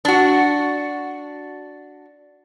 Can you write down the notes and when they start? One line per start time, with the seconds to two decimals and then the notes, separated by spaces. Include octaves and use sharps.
0.05 D4 F#4